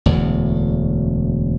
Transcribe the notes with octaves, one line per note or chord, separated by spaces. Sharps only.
E1 D2